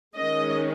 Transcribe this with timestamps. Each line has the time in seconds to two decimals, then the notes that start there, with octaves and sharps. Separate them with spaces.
0.15 D#3 G#3 C#4 D#5